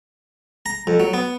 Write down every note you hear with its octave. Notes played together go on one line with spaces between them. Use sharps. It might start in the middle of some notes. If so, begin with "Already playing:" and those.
A#5
F2
F#3
B3